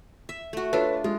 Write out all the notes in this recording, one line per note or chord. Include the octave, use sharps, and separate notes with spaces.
E5
A3 F#4
D4 F4 A4 B4 C#5
G#3 F4